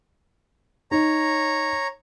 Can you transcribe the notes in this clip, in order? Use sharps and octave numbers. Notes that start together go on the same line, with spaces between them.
D#4 C#5 A#5